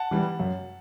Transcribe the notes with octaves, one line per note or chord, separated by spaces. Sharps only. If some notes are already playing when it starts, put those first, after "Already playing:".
Already playing: F#5 A5
E3 G3
F#2